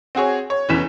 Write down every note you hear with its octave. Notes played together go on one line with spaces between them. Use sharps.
C4 F#4 G#4 C#5
C#5
F1 E2 E3 C#4 B6 E7